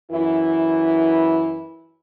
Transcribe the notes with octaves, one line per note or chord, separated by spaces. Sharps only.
F#2 E3 E4